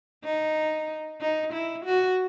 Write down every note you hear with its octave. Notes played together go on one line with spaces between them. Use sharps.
D#4
D#4
E4
F#4